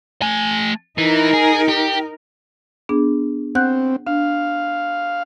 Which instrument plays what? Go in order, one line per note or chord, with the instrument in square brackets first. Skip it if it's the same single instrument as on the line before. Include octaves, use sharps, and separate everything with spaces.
[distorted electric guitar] A3 G#5
[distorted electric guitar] E3 [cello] D#4 A#4
[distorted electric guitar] G#4
G4
[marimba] B3 D4 G#4
[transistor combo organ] C4 [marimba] F#5 F#6 G6
[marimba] D4 [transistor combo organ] F5